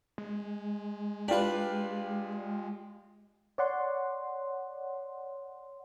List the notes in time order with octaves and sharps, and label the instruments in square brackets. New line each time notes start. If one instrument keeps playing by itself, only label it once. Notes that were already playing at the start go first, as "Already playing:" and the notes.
[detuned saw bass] G#3
[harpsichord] D4 B4 [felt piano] F4 G4
[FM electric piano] C#5 D5 F#5 C6